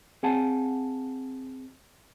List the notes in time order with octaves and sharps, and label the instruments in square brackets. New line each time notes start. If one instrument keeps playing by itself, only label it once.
[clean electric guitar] C4 G#4 F5 F#5 G#5 A5